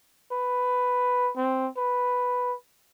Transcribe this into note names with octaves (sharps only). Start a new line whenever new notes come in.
B4
C4
B4